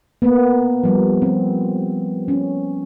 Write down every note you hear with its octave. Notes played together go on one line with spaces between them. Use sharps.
A#3 B3
F3 G3
C4
C#4